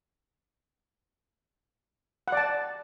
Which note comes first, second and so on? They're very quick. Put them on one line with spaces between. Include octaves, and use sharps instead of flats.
F#5 D5 A5